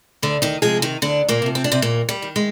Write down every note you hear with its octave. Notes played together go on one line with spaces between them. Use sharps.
D2 D3 D4
D#3 D#4
C3 F3 G#3 G#4
D#3 D#4
D2 D3 D4
A#2 A#3
C3 F3
C4
D4
C3 C4
D#2 A#2 A#3
G3
D#3
G#3